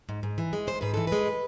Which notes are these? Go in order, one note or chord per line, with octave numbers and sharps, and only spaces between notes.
G#2
G#2
E3
G#3
G#2 C5
G#2 B4
E3 A4
G#3 B4